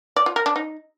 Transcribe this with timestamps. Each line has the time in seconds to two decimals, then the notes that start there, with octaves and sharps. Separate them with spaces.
0.16 D5
0.26 F4
0.36 A#4
0.46 D4
0.56 D#4